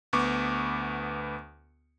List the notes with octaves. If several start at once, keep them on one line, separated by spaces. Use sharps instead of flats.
D2 B3 C#6 D6